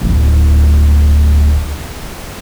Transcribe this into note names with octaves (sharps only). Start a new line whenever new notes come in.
D1 E4